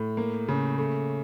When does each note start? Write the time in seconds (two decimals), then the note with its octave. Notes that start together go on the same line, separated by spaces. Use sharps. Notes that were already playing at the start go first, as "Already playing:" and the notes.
Already playing: A2
0.17 A#3
0.48 C#3
0.78 A3